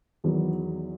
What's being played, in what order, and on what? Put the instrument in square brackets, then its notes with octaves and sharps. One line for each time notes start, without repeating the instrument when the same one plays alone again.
[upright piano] E2 D#3 F#3 B3